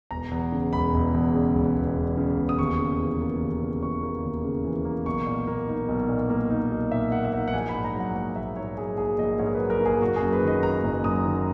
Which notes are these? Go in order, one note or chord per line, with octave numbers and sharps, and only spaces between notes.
E1 A#5
E2
C#3
E1 B5
E1
E2
C#3
E1
E1
E2
C#3
E1
D#6
D#2 C#6
C#3
E3
A#3
D#2
C#3
E3 C#6
A#3
D#2
C#3
E3
A#3
B1 C#6
A#2
A#3
D#4
B1
A#2
A#3
D#4
B1
A#2 E5
A#3 F#5
E5
D#4 F#5
F#5
A#1 G#5
B5
G#2
A#5
F#3
F#5
A#3 F#5
A#1 E5
G#2 C#5
F#3 G#4
A#3 G#4
A#1 D#5
G#2 C#5
A#4
F#3 B4
A#4
A#3 G#4
F#1 F#4
G#4
F#2
B4
D#3
D#5
A#3 A#5
F#1
F#2 D#6
D#3